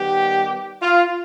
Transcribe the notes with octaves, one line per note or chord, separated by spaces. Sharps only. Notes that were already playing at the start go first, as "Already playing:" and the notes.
Already playing: D#3 G3 B3 G4
F4